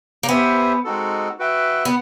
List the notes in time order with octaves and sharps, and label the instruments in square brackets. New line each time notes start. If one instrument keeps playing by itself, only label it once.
[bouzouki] A#3
[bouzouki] B3 [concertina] G4 C5 E5 G#5
[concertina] G#3 C4 D#4 F#4 A4
F#4 B4 E5 G5
[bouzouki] B3